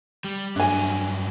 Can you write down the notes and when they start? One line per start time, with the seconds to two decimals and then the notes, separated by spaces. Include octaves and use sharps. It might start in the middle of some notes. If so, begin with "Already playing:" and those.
0.24 G3
0.56 G2 F#3 D4 G#5